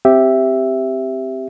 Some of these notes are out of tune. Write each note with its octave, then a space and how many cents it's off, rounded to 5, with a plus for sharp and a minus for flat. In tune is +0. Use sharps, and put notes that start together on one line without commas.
C4 +0 G4 +0 E5 +0